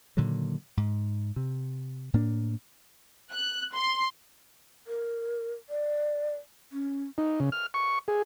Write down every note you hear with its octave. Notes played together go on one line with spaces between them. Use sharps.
A#2 D3 D#3 F#3
G#2
C3
A2 A#3 D4
F#6
C6
A#4
D5
C#4
D#4
C#3
F6
C#6
G#4